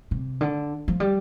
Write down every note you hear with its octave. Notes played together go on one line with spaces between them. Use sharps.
C3
D3
F3
G3